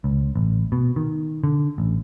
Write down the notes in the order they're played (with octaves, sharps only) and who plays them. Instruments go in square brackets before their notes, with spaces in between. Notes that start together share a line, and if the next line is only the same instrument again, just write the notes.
[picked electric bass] C#2
A1
B2
D#3
D3
A1